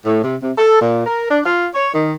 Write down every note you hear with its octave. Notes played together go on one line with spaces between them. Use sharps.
A2
C3
C3
A4
A#2
A#4
D4
F4
C#5
D#3